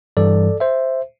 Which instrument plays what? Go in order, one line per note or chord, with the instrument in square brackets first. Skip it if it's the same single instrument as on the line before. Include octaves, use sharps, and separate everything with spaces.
[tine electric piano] G2 E3 G3 A4 D5
C5 E5